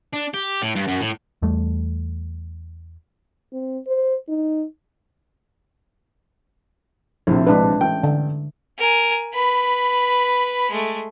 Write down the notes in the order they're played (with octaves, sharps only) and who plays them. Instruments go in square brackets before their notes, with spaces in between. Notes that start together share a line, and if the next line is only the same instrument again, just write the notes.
[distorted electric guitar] D4
G4
A2
G2
F#2
A2
[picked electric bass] E2 G3 A3
[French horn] C4
C5
D#4
[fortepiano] A#1 A2 C3
[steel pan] G#3 D4 B4
[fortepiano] A1 G5
[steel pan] D3
[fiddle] A#4 G#5
B4 B5
G#3 A3